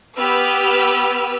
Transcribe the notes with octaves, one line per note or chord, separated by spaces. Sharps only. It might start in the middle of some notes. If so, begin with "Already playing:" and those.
B3 G4 B4 E6 F6